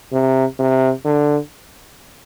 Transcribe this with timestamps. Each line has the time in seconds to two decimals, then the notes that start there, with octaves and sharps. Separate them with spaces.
0.13 C3
0.59 C3
1.05 D3